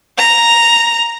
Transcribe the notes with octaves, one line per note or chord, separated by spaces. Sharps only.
A#5